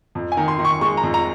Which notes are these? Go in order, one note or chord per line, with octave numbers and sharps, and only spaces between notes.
F2
G#5
D#3
C6
D#3
C#6
G#3 C#6
A#5
F2
A#5